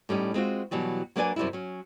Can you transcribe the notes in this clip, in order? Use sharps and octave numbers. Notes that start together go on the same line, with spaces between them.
A2 G3 C#4 D#4
G#3 C4 F4 F#4
B2 E3 F#3 G3
F#3 A#3 D4 B4 D5 G#5
F#2 C3 G3 E4
F#3 C#4